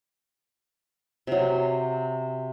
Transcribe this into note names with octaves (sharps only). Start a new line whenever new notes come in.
C3 F#3